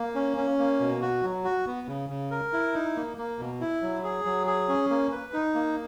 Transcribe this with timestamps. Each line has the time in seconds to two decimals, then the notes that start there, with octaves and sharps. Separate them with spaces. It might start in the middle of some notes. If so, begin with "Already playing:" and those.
Already playing: A#3
0.15 C#4
0.37 C#4
0.59 A#3
0.80 B2
1.02 F#4
1.23 F#3
1.44 F#4
1.66 B3
1.88 C#3
2.09 C#3
2.31 A#4
2.53 E4
2.74 D#4
2.96 A#3
3.17 A#3
3.39 B2
3.61 E4
3.82 F#3
4.04 G#4
4.25 F#3
4.47 G#4
4.69 C#4
4.90 A#3
5.12 B4
5.33 D#4
5.55 A#3